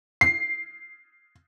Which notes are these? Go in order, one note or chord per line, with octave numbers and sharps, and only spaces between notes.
C7